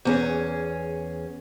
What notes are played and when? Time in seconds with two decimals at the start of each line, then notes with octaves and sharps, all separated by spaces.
0.05 E2 C#4 G#4